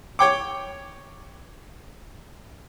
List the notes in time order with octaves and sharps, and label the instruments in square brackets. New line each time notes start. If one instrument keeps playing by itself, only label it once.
[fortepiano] C#5 G5 D6